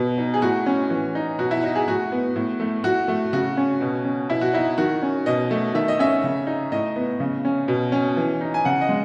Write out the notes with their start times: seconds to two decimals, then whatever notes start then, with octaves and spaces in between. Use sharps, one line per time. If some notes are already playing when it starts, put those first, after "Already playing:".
Already playing: B2 B3
0.18 D#4
0.34 G#4
0.42 A2 F#4
0.66 C#4
0.90 E3
1.15 D#4
1.39 B2 F#4
1.51 E4
1.63 D#4 F#4
1.75 G#4
1.88 A2 F#4
2.12 B3
2.36 A2
2.60 A3
2.84 A2 F#4
3.08 A3
3.33 C#3 F#4
3.57 C#4
3.81 B2
4.05 C#4
4.29 B2 E4
4.41 F#4
4.53 D#4 E4
4.78 D#3 F#4
5.02 C#4
5.26 B2 D#5
5.51 A3
5.74 D#3 E5
5.88 D#5
5.99 C#4 E5
6.23 C#3
6.47 D#4
6.72 A2 D#5
6.96 B3
7.20 C#3
7.45 C#4
7.68 B2
7.92 C#4
8.17 E3
8.41 D#4
8.54 G#5
8.65 C#3 F#5
8.81 D#5
8.89 G#3